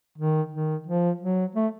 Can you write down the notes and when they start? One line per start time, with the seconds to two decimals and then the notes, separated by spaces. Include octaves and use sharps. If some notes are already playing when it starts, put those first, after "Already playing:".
0.18 D#3
0.52 D#3
0.86 F3
1.21 F#3
1.55 A3